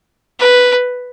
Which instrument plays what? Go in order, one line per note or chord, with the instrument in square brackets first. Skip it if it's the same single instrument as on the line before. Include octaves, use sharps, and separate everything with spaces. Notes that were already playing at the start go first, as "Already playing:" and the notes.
[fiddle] B4